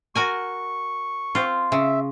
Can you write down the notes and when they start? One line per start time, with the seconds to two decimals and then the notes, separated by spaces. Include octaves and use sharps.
0.15 F#4 A#4 G#5 C#6
1.35 C4 F4
1.72 C#3 E5